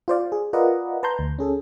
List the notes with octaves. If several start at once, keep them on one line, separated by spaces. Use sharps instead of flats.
F4 C5 D5 F5
G#4
F4 A#4 B4 D5 D#5 F#5
B4 A5 A#5 C6 G6
D2
C#4 G#4 A4